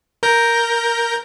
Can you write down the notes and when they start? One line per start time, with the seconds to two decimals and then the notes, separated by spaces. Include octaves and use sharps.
0.23 A#4 G6 A#6